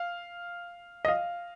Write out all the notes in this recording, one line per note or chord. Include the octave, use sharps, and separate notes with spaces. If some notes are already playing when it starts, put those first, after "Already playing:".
Already playing: F5
D#5
F5